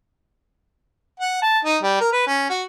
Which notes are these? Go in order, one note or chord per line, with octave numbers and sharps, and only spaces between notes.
F#5
A5
D#4
G3
A#4
B4
C#4
F#4